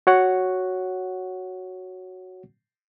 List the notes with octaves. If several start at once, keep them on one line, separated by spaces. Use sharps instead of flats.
F#4 C#5 F#5